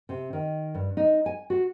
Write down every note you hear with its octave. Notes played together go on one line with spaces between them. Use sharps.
C3
D#3
G2
D#4
G#5
F#4